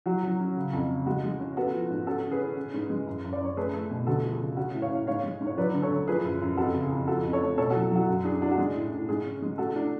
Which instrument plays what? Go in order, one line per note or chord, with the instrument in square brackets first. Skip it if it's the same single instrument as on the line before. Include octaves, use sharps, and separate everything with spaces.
[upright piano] F#3 F#4
F#3
C#4
C#3
F2
C#3
G#3 F#4
G#3
C#4
B3 F#4 A4
F3
G#2
C#4 F#4 A4
C#4
G#4 B4
C#4
C#4
G#2
G#3
F#2
F#2
D5
F#2 C#5
A3 G#4 B4
A3
B2
D2 F#4 A4
F3
G#4
C#3
C#4 F#4
A2
C#5 F5
A2
G#2 C#5 F5
G#3
G#2
C#5
F#3 B4 D5
D3
A4 C#5
D2
F3 G#4 B4
F#2
F#2
F2 F#4 A4
C#3
G#4
F2
F3 F#4 A4
F2
A4 C#5
A3
B2 A4 C#5
F#4 A4
F#3
F#3 F#4
F#2 F#4
D4 G#4
D4 F#4
F#4
G#3 G#4
A2
A2
G#2 G#4
C#4
G#3
A3 F#4 A4
D4